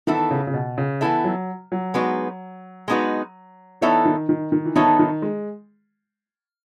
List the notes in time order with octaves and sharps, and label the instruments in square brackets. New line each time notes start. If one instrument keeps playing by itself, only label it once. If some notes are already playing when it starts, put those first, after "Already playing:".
[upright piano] D#3 [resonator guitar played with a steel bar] E3 B3 E4 A4 E5
[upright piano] C#3
C#3
B2
C#3
[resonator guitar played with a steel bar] E3 B3 E4 A4 E5
[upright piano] F#3
F#3
[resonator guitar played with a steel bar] G#3 B3 D#4 F#4 B4
G#3 B3 D#4 F#4 B4
[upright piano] E3 [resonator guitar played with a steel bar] B3 D#4 A4 C#5 E5
[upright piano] D#3
D#3
D#3
E3
[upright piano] D#3 [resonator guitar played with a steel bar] B3 D#4 A4 C#5 E5
[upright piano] D#3
G#3